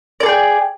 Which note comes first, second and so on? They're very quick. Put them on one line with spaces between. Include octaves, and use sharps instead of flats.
D5 A4 G#4 G5